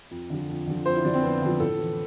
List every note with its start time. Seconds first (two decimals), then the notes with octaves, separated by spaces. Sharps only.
0.11 F2
0.30 D3 F3
0.49 F2
0.67 D3 F3
0.86 F2 C5
0.95 E4
1.04 D3 F3 D4
1.14 C4
1.23 F2 B3
1.42 D3 F3
1.60 A2 A4
1.79 E3